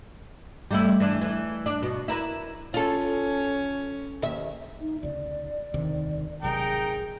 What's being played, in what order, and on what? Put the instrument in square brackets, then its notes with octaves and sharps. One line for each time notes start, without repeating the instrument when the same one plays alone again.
[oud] G3 A3 E4
E3 D4
E3
D4
B2
E4 A#4 B4
[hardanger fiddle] C#4 [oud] F4 A4
[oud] D#2 E5
[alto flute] D#4
[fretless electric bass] D2 C#3 [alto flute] D5
[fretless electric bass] E1 D2 C3 [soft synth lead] D#3
[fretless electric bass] G#1 C3 F#3 [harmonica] D#4 A#4 G5 [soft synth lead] G#4